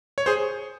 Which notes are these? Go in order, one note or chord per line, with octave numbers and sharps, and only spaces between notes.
C#5
G#4 C5